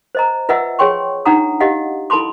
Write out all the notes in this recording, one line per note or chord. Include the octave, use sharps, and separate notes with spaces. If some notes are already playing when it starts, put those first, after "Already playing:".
C5 D#5 A#5
F4 B4 D#5 E5 F#5 E6
G#4 C#5 G5 C6 C#6
D4 D#4 F4 F#5 A#5 D#6
G4 D#5 F5 F#5
E4 A4 A5 B5 C6 D6